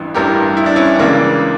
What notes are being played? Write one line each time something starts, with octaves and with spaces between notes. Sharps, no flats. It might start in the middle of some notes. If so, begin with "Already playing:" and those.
Already playing: A1 G2 E3
A1 G2 E3 G4 A#4
E4
D4
C#4 E4
C#2 C#3 E3 A#3 D4